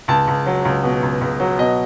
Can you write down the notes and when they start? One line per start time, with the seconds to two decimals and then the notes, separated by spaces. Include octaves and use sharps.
0.08 C#2 A5
0.28 C#2
0.46 F#3
0.65 C#2
0.83 B2
1.03 C#2
1.21 C#2
1.40 F#3
1.58 B2 D#5